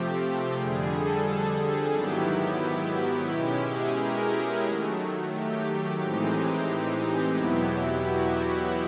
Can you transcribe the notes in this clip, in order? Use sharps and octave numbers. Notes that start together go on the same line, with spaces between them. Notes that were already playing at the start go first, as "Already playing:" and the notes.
Already playing: C3 F3 A3 C4 G4
F2 D3 G3 G#4
A4
G#2 D#3 F#3 B3 E4 G4
B2 G#3 C#4 E4 G4
G#4
A#4
D#3 F#3 A3
G4
A2 E3 G#3 C4 D#4
E2 B2 F#3 B3 E4
F#4